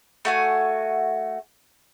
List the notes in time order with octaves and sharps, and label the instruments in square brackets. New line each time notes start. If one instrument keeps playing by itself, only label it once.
[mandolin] A3 F#4 G#5